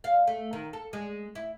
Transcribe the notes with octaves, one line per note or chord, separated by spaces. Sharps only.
F5
A3
D#3
A4
G#3
E4